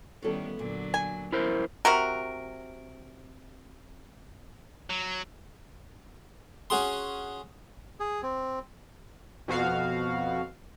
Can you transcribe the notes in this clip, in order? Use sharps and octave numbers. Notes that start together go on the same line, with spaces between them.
D#3 G3 B3 C#4 E4 A4
A#2 D3 F#3
G#5
E3 F#3 B3 E4 A#4 C5
C3 F#4 A#4
F#3
C#4 F#4 G#4 C6
G#4
C4
F2 B2 F#4 F5